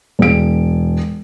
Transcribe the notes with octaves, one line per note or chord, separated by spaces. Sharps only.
E1 D7